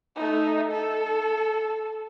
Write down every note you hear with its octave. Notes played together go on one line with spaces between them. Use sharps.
A3 D#4
A4